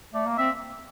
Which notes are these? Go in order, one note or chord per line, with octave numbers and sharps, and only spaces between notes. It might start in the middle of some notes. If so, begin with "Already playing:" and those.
A3 D5
A#3
C4 E5